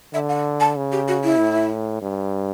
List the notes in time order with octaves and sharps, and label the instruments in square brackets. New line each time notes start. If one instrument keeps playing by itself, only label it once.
[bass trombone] D3 [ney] E5
[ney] F#5
A5
[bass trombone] C#3
[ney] G4
F#4
E4
[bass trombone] A2
G2